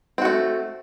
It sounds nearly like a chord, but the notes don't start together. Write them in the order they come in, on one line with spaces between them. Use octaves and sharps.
C4 F#4 A3